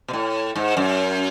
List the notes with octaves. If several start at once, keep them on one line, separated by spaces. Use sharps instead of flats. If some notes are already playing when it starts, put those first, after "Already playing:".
B2
A2
G#2
F#2